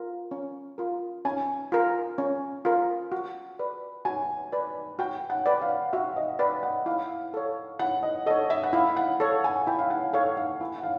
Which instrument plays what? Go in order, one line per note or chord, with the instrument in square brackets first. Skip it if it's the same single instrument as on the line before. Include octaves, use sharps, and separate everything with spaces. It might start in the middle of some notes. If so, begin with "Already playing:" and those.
Already playing: [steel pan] F4 A#4
C#4
F4 A#4
[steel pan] C#4 [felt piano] G#5
[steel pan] F4 A#4
C#4
F4 A#4
F#4
B4 D5
[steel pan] F#4 [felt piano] G#5
[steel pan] B4 D5
[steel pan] F#4 [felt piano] G5
[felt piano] F#5
[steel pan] B4 D5
[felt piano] F5
[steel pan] F#4 [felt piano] E5
[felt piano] D#5
[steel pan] B4 D5 [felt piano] G5
[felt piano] F#5
[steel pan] E4 [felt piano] F5
[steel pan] A4 C#5
[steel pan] E4 [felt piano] F#5
[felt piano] D#5
[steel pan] A4 C#5 [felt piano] D#5
[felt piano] E5
F#5
[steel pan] E4 [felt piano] F5
[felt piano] F#5
[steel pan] A4 C#5
[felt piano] G#5
[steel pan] E4 [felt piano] G5
[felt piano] F5
F#5
[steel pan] A4 C#5 [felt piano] F5
[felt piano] F5
[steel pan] E4
[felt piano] F#5
F5